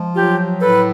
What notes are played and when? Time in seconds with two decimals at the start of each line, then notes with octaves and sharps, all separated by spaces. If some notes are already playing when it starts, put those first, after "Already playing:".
Already playing: F3 G#3
0.15 F#3 F4 G4
0.61 A2 A4 B4